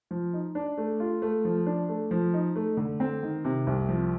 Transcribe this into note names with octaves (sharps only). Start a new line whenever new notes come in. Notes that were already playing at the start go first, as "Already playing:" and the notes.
F3
D#4
D4
A3
F4
A3
F3
D4
A3
F3
D#4
A3
D3
C4
D#3
C3
C2
F3